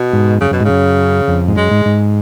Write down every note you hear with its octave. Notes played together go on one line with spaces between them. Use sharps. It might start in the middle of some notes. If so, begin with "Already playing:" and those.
Already playing: B2
G#2
F#2 C#3
F#2 B2
G#2
F#2 C#3
F2
G#2
F#2 G#3
G#2
G#2